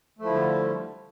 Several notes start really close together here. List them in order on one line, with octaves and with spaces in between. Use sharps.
A3 F3 E4 D3 G3